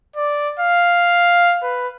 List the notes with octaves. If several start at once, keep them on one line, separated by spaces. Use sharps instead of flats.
D5
F5
B4